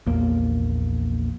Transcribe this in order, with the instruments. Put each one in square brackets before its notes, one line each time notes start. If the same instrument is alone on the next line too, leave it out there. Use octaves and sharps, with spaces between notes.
[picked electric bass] A#1 E2 A#3